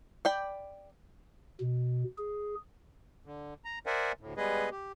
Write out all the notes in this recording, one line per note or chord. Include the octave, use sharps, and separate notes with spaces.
D5 G5 B5
B2
G#4
D3
A#5
A#4 C5 D5 E5 F#5 G#5
D2 A2
G3 G#3 B3 G#4 B4 D#5
G4